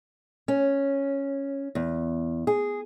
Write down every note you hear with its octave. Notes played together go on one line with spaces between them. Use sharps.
C#4
E2
G#4